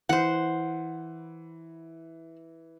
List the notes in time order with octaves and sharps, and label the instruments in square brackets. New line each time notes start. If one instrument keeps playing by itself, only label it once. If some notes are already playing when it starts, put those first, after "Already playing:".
[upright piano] E3 [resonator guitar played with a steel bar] C5 F#5